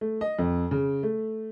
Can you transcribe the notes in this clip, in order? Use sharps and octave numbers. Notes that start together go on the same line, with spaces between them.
A3
D#5
F2
C#3
A3